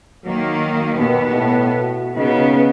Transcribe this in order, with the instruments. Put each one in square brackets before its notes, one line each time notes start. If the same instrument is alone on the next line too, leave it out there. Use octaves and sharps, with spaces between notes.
[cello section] D#3 A#3 [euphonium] F#3
[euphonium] D#2 [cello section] B2 B3
[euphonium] A2
F#4
[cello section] C#3 B3 [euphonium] D#4